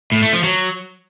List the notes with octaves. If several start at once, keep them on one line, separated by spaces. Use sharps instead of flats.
A2
A3
F3
F#3